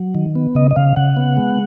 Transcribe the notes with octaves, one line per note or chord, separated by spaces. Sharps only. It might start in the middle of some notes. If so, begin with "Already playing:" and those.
Already playing: F#3
D#3
B3
C#3 D#5
D#5
C#3 F5
C#3 F#5
B3
G#3